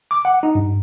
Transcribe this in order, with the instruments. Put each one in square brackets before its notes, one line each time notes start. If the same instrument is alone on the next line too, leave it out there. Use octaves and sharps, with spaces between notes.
[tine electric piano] D6
F#5
D#4
G2